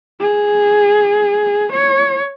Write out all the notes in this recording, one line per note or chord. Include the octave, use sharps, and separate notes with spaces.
G#4
C#5